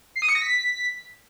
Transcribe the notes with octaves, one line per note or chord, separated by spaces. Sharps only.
C7
D#6
C#7
A#6
B6